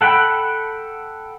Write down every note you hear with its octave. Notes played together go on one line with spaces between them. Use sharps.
A4 F#5 G5 B5